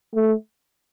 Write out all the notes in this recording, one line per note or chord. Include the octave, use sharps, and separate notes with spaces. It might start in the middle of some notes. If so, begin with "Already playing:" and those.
A3